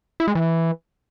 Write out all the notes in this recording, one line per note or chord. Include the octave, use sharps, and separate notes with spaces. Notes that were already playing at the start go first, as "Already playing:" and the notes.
E4
G#3
E3